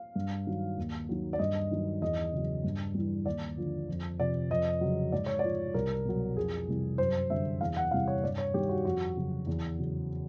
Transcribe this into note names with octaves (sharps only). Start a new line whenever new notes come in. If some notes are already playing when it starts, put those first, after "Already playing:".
Already playing: F5
G2
D#3 F#3
D#2
D#3 F#3
D5
G2 D#5
D#3 F#3
E2 D#5
C#3 F#3
G2
E3 G3
D#2 D5
D3 F3
F2
C3 F3 D5
F2 D#5
C#3 F#3
G#2 D5
C#5
F3 D5
C2 A#4
B2 F#3
F2 G#4
C3 E3 G3
F#2 C5
D3 G3 E5
E2 F5
F#5
C3 E3 G3 F5
C#5
G2 D5
C#5
D#3 G3 G4
F#4
F2 F#4
C#3 F#3
E2
C#3 F#3